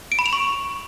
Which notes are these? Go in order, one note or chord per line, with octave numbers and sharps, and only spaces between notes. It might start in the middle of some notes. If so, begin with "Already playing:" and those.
D7
B5
F7
C#6